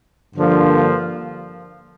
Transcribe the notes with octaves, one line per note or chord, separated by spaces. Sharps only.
G2 D3 F3 A#3